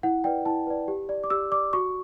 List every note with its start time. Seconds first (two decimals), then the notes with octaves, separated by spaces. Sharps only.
0.03 E4 F#5
0.24 B4 D5 G5
0.46 E4 A5
0.67 B4 D5
0.88 G4
1.09 D5
1.24 D6
1.30 G4 E6
1.51 D5 D6
1.73 F#4 C#6